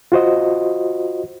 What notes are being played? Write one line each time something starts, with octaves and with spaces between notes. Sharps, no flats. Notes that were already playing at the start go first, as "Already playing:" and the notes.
F4 F#4 C5 D#5